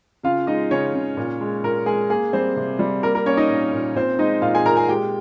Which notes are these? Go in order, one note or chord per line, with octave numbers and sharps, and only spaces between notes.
C#3 F4 F5
G#3 D#4 D#5
C#3 C#4 C#5
C#3
A#2
G#3
A#2 A#4
G#3 G#4
A#3 G#4
G3 C4 C5
C3
G3
A#3 A#4
A#4
A#3 C#4 C#5
D#4 D#5
A#2
A#2
A#2 C4 C5
G#3 D#4 D#5
A#2 F4 F5
G#4 G#5
A#2 A#4 A#5
G#4 G#5
G#3 G4 G5